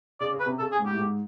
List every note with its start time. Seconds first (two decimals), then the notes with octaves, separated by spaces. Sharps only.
0.20 C#3 D5
0.33 C#3
0.40 B4
0.46 C3
0.59 C#3 A4
0.72 G#4
0.79 G#2
0.86 G4
0.91 A2
0.98 G#2